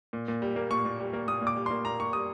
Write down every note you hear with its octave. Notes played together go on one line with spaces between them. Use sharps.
A#2
A#2
G3
A#3
A#2 C#6
A#2
G3
A#3
A#2 D#6
A#2
D6
G3
C6
A#3
A#2 A#5
A#2 C#6
G3 D#6